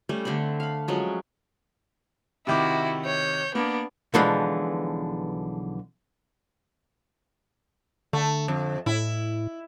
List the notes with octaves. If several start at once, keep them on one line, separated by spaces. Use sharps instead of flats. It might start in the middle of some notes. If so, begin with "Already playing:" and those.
G3 A3 C#4
D3 A3 C4 B5
F5 B5
F3 F#3 G#3 C#4
C3 D#3 E4 F#4 D6
C#5 G6
A#3 B3 D4
B1 D3 E3 F3 G#3 F#5
D3 A3
F2
A2 E4